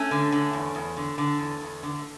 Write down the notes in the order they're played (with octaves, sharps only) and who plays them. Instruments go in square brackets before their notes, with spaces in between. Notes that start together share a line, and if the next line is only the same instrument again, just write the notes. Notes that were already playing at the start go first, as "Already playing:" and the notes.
Already playing: [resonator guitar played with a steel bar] A3 C#4
D3
D3
E2
E2
D3
D3
E2
E2
D3